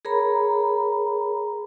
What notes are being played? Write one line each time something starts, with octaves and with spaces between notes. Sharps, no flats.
G#4 A#4 C#5 A#5 B5